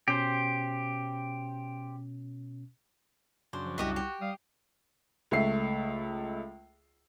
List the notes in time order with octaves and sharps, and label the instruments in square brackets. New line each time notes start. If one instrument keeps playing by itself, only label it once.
[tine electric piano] B2 C#4 [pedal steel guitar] G4 C5
[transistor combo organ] F#2 C#3 D4 [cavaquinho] C5
[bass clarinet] F3
[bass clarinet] C2 [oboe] F#4 [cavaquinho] G4 D#5 E5
[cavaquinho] G4
[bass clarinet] G3 [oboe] F5 [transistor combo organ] D#6
[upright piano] C#2 A3 E5 C7